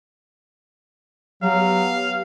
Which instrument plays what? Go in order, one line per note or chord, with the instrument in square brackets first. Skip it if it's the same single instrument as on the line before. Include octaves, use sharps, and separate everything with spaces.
[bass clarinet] F#3 [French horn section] B3 G4 [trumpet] F5